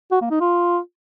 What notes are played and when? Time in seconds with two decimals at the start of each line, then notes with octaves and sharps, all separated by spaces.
0.12 F#4
0.21 A#3
0.31 D#4
0.41 F4